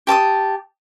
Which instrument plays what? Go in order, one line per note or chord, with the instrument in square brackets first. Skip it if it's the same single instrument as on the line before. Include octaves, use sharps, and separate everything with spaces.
[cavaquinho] G4 A5 D6 D#6